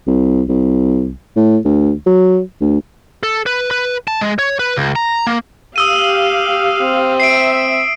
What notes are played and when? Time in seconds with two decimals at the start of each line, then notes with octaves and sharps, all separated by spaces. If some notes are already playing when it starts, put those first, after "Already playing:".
0.07 C2
0.49 C2
1.36 A2
1.65 D2
2.06 F#3
2.61 D2
3.23 A4
3.46 B4
3.71 B4
4.08 A5
4.21 G#3
4.39 C#5
4.59 B4
4.76 C#2
4.96 A#5
5.27 A#3
5.76 G4 F5 D#6 E6 D#7
6.82 C4
7.20 E5 C7 D7